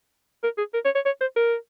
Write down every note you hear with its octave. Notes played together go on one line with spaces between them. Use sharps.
A#4
G#4
A#4
C#5
C#5
C#5
C5
A#4